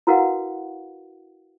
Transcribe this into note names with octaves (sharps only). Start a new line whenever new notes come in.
E4 F#4 A#4 B4 F5 F#5